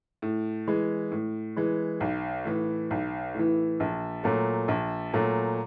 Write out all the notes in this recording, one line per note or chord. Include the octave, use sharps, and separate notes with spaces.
A2
E3 G#3
A2
E3 G#3
B1
A2 E3
B1
A2 E3
A#1
A#2 F#3 A3
A#1
A#2 F#3 A3